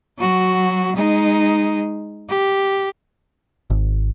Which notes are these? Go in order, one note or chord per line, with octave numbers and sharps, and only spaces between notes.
F#3 F#4
G#3 D#4
G4
G#1